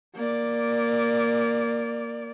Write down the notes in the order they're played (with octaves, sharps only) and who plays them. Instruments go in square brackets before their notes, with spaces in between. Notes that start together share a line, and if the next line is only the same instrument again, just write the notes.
[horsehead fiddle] A#3 D5